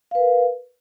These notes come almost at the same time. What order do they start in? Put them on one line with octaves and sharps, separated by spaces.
F5 B4 A#4